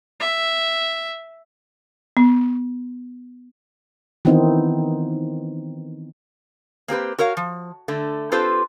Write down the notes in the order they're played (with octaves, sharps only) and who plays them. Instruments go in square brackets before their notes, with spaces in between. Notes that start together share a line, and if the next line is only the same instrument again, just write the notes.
[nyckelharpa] E5
[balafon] B3
[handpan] D#3 E3 B3 C4 D#4
[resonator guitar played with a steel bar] A#3 C4 G4 B4
F#4 A#4 C#5 F5
F3
D3 A3
C4 F4 G4 A4 B4 C5